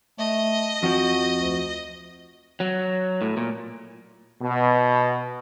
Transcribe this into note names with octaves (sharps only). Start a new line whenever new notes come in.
A3 D#5
F2 F3 F#4
D2
F#3
A2
A#2
B2